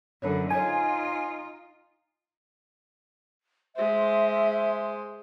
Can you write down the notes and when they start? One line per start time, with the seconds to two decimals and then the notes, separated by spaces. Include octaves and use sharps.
0.22 F#2 D3 A4 B4 C#5
0.50 D#4 F4 A4 C5 C#5 G#5
3.76 G#3 C5 E5